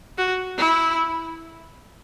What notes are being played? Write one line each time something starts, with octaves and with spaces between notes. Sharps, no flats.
F#4
E4